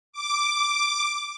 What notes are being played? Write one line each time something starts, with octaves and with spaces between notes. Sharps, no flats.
D6